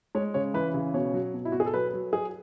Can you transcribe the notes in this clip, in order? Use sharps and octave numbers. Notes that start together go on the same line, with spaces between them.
G#3 C#5
C#3 C#5
E3 B4
C#3
B2 C#5
F#3
B2
E4
B2 F#4
G#4
A4
F#3 B4
F#3
F#3 G#4